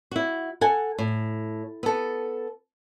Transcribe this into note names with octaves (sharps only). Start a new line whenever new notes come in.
E4 F#4
A4 F#5 G#5
A2
B3 A4